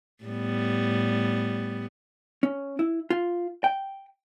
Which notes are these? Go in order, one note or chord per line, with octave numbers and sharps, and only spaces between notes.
A2 G3 B3
C#4
E4
F4
G5